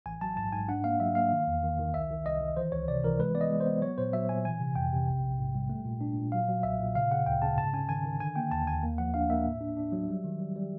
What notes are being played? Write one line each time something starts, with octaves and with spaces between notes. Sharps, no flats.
A1 G#5
F#3 A5
G#2 A5
G#2 G#5
D4 F#5
A#3 F5
F#3 E5
A#3 F5
D#3
E2
D#3
D#3
C2 E5
D#3
C2 D#5
D#3
E3 C5
C#2 C#5
C3 D5
E3 A#4
G#3 B4
B3 D5
D#5
G#3
C5
B3
F#3 C#5
A#2 C5
F#3 E5
A#2 G#5
E3 G#5
C3
F2 G5
C3
A#1
A#1
G#2
G3
A3
A#2
D4
A#2
F#3 F5
F#3
B1 E5
A#2
C#3 F5
C#3 F#5
D2 G5
C#3 A5
G#2 A5
C#4 G#5
D#3 G#5
D#3
D3 G#5
A#3 G5
D#2 A5
D#2 G#5
A#3
F3 F#5
D4 F5
A#3 E5
A2
D4
D4
F#3
G3
D#3
G3
G3